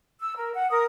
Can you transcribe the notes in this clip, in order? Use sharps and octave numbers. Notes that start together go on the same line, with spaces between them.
E6
A#4
F#5
A#4 D#6